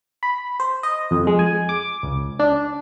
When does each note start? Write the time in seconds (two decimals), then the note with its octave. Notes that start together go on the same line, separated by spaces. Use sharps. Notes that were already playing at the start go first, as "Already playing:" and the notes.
0.23 B5
0.60 C5
0.83 D#5
1.11 F2
1.27 G#3
1.39 G#5
1.69 D6
2.03 C#2
2.39 D4